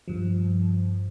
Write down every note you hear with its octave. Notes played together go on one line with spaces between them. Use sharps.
G2 F3